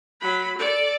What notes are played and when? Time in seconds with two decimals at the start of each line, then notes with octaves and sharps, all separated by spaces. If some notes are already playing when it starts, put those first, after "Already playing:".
0.21 F#3 B5
0.57 A4 D5